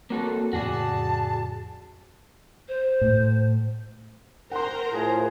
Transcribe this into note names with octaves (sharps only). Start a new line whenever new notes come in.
A#3 C4 F#4 A4 A#4 C#5
F2 A2 C#3 F#4 G#4 D5 A5
C5
A2
A#4 C5 F#5 A#5 C6
A2 F3 G#4